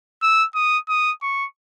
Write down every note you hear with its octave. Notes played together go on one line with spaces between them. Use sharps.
E6
D#6
D#6
C#6